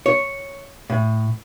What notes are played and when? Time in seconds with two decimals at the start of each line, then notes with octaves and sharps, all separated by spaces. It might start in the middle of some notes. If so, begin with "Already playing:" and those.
0.06 C#5
0.90 A2